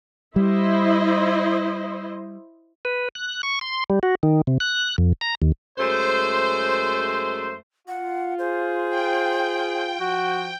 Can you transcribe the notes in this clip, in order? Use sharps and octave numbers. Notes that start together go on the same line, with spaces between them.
G3 E4 C5 D#5
B4
F#6
C#6
C6
G3
F#4
D#3
C3
F#6
F2
A#5
D#2
F#2 G#3 A3 C5
F4 F#5
G#4 C5
G5
F3 F#4